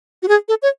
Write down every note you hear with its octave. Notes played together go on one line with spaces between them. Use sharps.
F#4
G#4
A4
C#5